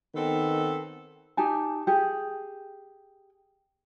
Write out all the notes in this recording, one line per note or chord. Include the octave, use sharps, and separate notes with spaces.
D#3 B3 C4 A4
D#4 G4 G#5 A5
G4 G#4